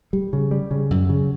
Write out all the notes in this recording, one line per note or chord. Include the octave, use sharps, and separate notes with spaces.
G3
C#3
G3
C#3
F#2
C#3